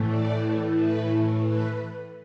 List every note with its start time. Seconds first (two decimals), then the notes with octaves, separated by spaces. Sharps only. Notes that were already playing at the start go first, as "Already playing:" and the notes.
Already playing: A2 E3 A3
0.10 D5
0.78 B4
1.46 B4